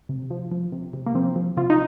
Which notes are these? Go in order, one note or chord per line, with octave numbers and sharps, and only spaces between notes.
C3
F3
F3
C3
C3
A#3
F3 C4
F3
C3 F4
D#4